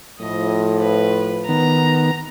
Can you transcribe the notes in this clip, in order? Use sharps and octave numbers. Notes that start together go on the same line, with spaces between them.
A2 F3 D#5
B4
D#3 B3 A#5